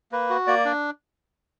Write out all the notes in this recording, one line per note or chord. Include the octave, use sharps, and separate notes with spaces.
A#3 B4
F#4
A#3 D5
D4